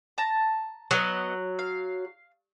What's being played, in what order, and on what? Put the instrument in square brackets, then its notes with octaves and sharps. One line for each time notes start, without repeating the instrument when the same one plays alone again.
[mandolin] A5 A#5
[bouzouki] F#3 [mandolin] B3 D#5 F#5
[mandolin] F5